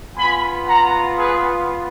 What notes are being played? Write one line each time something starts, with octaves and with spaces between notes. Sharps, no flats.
B3 F4 G#5 B5
F#5 A#5
G#4 B4